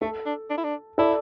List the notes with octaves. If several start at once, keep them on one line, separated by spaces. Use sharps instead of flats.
A3 A4
D4
D4
E4
D4
E4 A4 D5